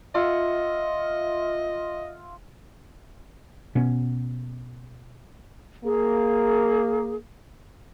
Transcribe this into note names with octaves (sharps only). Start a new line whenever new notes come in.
F4 D#5 E5 F#5
B2 B3 C#4
A#3 G#4